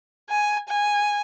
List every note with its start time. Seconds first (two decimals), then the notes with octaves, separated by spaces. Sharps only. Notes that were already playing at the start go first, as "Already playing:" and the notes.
0.30 G#5
0.69 G#5